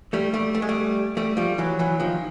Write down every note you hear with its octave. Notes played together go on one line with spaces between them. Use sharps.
G3 A3
G3 A3
A3
G#3
G3 A3
G3 A3
F3 G3
E3 F#3
E3 F#3
D#3 F3